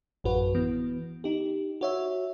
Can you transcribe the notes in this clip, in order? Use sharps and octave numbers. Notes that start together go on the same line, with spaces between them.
A1 F#2 F#4 B4
E3 B3
D#4 G4
F#4 C#5 E5